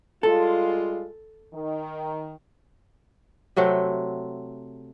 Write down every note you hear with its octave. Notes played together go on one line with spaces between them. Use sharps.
G3 G#3 F4 A4
D#3
C3 F#3 A3 C4